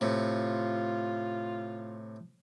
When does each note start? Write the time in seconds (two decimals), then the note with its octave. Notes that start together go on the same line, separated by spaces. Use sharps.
0.01 A2 C3 F4